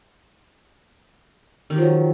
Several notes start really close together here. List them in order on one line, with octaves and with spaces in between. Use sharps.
D#3 G4 F3 F#3